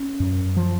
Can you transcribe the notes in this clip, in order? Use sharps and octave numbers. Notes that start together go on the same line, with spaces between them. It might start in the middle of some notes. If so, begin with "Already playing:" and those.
Already playing: C#4
F#2
F3